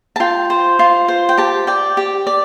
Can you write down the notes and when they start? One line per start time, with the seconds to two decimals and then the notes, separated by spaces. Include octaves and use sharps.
0.16 A5
0.20 F4 G5
0.50 C5
0.79 F4
1.08 C5
1.29 G5
1.37 G4 A5
1.67 D5 G5
1.97 G4
2.27 D5